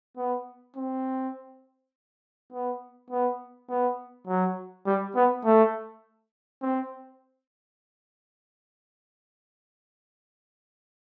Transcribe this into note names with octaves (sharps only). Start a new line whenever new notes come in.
B3
C4
B3
B3
B3
F#3
G3
B3
A3
C4